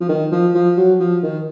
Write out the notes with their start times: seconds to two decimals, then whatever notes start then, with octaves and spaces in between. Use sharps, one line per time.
0.01 F3
0.09 D#3
0.32 F3
0.55 F3
0.77 F#3
1.00 F3
1.23 D#3